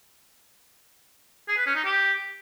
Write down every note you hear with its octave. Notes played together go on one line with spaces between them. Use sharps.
G#4
B4
C#4
D#4
G4